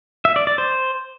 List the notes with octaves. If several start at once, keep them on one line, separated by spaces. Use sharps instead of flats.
E5
D5
D5
C5